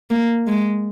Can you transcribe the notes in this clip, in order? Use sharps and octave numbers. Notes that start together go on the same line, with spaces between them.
A#3
G#3